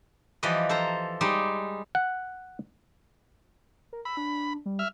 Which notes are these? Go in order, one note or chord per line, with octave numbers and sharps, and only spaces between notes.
E3 F3 G3 B4 D#5
A4 C5 A#5
G3 G#3 D#4
F#5
A#4
B5 E6
D4
G3
E5 F6